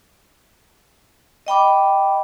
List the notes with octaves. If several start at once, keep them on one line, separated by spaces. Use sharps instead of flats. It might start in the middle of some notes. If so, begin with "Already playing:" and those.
D#5 G5 B5 D6